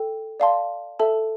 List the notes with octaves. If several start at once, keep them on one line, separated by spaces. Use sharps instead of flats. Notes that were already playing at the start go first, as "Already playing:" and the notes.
Already playing: A4 G5
D5 F5 A5 C6
A4 E5 A5